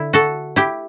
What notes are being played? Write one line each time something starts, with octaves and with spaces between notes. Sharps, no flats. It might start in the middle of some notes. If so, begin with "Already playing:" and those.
Already playing: D3 E4
F#4 A4
E4 G4